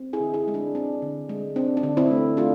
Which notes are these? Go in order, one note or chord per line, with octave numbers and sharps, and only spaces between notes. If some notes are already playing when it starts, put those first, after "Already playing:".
Already playing: C4
E4 G#4
D3
E4 G#4
G#3
D4
C4 D4
D3
G#3
C4 D4
D4
D3
C4 E4
A3
A3 D4 F4